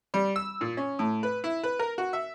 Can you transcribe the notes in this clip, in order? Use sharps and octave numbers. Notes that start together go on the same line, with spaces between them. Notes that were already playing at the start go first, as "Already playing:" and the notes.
G3
E6
A#2
C#4
A2
B4
E4
B4
A#4
F#4
E5